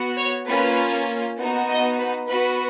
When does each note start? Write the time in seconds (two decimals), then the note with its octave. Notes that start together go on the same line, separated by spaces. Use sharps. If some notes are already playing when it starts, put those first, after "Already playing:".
Already playing: B3 F#4
0.17 C#5
0.47 A#3 C#4 F4 B4
1.38 B3 D#4 F#4
1.69 D#5
1.98 B4
2.29 B3 F#4 B4